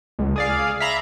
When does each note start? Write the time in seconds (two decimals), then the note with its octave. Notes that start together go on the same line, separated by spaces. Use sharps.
0.19 C#2
0.36 G#4 D5 F5
0.80 E5 F5 A#5 B5